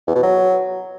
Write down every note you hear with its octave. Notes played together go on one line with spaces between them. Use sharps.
E2
B2
F#3